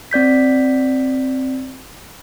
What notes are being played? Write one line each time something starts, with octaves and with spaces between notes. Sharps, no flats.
C4 D5 G6 B6